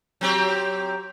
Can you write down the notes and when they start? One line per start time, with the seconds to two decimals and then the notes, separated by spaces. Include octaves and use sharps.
0.21 F#3 C4 G4